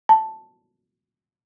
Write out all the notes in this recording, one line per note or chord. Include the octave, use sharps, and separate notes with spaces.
A5